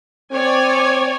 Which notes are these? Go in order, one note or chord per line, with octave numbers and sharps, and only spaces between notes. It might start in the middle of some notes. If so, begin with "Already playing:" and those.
C4 C#5 D5 G#5